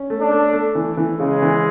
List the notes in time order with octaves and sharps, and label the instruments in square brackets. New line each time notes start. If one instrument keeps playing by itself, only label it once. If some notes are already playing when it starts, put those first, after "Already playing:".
Already playing: [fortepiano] C#4
A3
[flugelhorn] D4
[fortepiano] A3
A3
E3
E3
[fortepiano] C#3 [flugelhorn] G#3
[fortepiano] E3